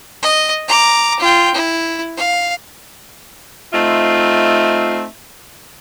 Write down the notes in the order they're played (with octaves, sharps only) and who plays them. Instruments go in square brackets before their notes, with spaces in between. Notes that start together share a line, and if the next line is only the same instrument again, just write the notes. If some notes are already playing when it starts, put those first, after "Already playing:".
[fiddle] D#5
A#5 D6
F4 G5
E4
F5
[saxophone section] A3 C4 D#4 F4 E5